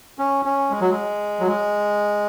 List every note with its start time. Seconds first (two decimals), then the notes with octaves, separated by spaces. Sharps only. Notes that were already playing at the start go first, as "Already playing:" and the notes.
0.19 C#4
0.45 C#4
0.70 G#3
0.81 F#3
0.91 G#3
1.40 F#3
1.47 G#3